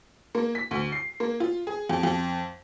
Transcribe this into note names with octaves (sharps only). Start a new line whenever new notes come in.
A#3
B6
D2
C7
A#3
F4
G#4
F2
F2